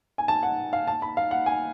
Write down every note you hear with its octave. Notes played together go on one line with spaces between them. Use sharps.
G#5
A5
F#5
F5
A5
B5
F5
F#5
G#5